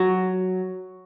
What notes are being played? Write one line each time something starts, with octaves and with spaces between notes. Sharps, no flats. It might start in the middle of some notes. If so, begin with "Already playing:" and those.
Already playing: F#3